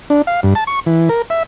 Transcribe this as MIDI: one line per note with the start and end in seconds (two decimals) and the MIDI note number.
0.10 0.22 62
0.27 0.40 77
0.43 0.54 43
0.55 0.64 81
0.67 0.80 85
0.86 1.09 52
1.09 1.22 70
1.30 1.43 76